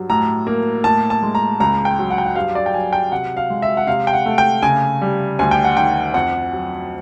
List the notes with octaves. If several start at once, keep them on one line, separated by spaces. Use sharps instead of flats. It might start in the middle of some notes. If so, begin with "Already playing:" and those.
Already playing: G2 F#3
A2 A#5
A#3
A2 A5
A5
G#3
A#5
C#2 A#5
G5
F#3
F#5
G5
F#5
G2 F5
D5
G5
F#3 G#5
G5
C3 F#5
F5
G#3
E5
F#5
C3 F5
G5
F#5
A3
G5
C#3 G#5
G3
D2 G#5
G5
F#5
D#3 G5
F2 F#5
F#3